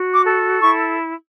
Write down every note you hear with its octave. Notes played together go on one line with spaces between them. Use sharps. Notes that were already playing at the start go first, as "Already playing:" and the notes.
Already playing: F#4
D6
A4
E4 C#6